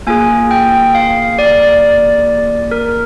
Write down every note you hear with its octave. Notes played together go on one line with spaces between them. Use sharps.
A#3 F4 G#4 G#5
G5
F5
D5
A#4